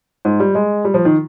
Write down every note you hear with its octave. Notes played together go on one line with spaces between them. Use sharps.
G#2
G3
G#3
G3
F3
D#3